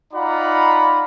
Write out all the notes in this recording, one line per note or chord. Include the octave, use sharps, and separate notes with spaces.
D#4 F4 D5 F#5 A#5 B5